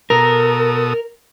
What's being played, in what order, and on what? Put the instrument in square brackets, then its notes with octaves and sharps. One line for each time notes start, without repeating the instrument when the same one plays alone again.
[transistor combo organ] B2 A4 D#6 [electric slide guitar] A#4